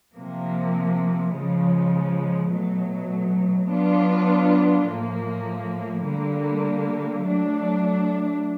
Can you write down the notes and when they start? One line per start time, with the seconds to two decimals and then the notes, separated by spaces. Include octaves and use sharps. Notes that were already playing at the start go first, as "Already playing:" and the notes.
0.15 C3 F3 A#3
1.32 C#3 F3 G#3
2.50 B2 F#3 A3
3.68 F#3 B3 D4 F4
4.86 A2 F3 A#3
6.04 D3 G3 A#3
7.21 F#3 A3 D4